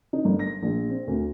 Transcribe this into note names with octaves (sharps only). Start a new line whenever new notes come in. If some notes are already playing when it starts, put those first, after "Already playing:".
D#4
G1
A#6
A#1
C4
D2